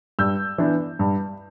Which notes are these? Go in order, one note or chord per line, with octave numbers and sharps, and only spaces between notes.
G2 E6 G6
E3 B3 D4
G2